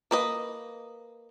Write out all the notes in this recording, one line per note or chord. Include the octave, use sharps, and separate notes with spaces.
A#3 B4 D#5